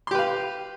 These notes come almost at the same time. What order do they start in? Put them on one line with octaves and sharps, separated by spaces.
C6 G4 B4 F5